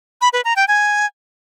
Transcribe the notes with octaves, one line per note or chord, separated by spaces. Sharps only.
B5
B4
A#5
G5
G#5